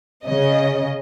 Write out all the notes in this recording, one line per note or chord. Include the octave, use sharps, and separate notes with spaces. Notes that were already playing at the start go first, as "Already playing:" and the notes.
C#3 D#5